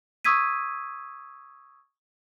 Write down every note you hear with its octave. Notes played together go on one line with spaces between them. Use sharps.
C#6 D#6 E6 G#6 B6 D#7